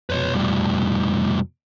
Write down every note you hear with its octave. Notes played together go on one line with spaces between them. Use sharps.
F1 B2 B4 C#5
A2 G3